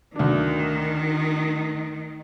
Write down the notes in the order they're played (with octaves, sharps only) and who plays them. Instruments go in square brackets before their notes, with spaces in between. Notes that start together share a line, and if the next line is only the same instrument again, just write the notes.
[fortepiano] D2 D4 [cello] D#3